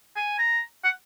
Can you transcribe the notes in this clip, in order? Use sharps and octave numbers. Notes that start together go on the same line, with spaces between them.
G#5
A#5
F#5